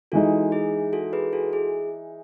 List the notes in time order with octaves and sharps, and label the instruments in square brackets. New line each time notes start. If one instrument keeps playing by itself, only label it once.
[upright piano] E3 G#3 D#4 [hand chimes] F#4 A4
[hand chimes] G#4
F#4 A4
G#4 B4
F#4 A4
G#4